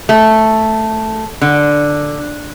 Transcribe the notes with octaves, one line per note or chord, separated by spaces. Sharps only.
A3
D3